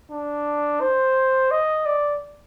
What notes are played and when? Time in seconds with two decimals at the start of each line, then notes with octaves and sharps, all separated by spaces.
0.10 D4
0.81 C5
1.51 D#5
1.86 D5